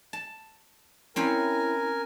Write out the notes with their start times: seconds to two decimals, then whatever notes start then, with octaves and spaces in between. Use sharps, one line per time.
0.13 A5
1.16 C4 C#4 E4 A#4 C5 G#5